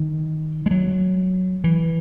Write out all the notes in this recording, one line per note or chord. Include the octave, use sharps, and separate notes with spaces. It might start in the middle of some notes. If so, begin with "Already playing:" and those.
Already playing: D#3
G#3
F#3
E3